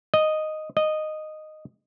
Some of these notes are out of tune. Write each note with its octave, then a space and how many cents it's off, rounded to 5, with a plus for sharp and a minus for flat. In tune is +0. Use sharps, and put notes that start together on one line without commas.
D#5 -5
D#5 -10